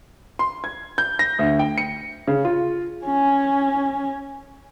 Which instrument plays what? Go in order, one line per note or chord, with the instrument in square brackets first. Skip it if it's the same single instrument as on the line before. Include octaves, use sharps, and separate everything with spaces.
[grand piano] C6
G#6
G6
A#6
D2
G5
C#7
C#3
F4
[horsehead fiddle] C#4 G#5